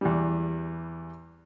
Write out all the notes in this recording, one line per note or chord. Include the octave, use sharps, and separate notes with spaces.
E2 E3 G3